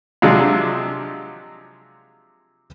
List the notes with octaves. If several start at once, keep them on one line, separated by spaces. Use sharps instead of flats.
C3 F3 F#3 G#3 D4